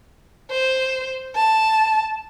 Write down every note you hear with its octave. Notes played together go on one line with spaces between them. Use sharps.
C5
A5